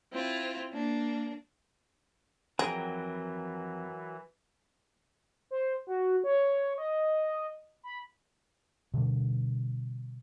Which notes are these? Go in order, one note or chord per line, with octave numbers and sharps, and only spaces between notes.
C4 E4 F4
A#3 D4
F2 E3 F#3 G#4 A#4 G5 A#5
C5
F#4
C#5
D#5
B5
B2 D3 G3